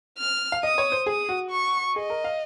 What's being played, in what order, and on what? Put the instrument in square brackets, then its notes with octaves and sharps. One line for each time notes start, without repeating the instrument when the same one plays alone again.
[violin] F6
[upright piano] F5
[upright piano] D#5 [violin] D#6
[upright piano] C#5
C5
[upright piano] G#4 [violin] D#6
[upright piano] F#4
[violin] C#6
[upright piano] G#4 [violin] D#5
[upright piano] A#4
F5